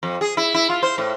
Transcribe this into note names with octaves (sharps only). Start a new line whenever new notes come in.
F2
G#4
E4
E4
F4
C5
A2